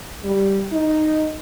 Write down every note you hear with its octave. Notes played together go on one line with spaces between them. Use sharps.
G3
D#4